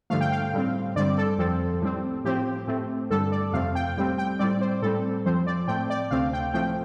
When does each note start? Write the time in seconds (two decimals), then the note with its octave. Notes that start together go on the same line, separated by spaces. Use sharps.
0.10 G2 D3 F3 A3 F5
0.21 G5
0.32 F5
0.54 A2 G3 C4
0.95 G2 D3 G3 C4 D5
1.18 A4
1.38 F2 F3 C4 A4
1.81 A2 G3 C4
2.25 A2 F3 C4 G4
2.67 A2 A3 C4
3.11 G2 D3 G3 A4
3.32 D5
3.53 F2 C3 A3 C4 F5
3.75 G5
3.97 A2 G3 C4 G5
4.18 G5
4.39 A2 G3 C4 D5
4.61 C5
4.82 A2 G3 C4 A4
5.26 F2 F3 C4 C5
5.47 D5
5.68 A2 A3 C4 G5
5.90 D5
6.11 D2 C3 A3 C4 F5
6.33 G5
6.54 A2 F3 A3 C4 G5